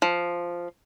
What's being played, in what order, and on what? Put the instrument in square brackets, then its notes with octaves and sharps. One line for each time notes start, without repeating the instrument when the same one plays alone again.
[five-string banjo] F3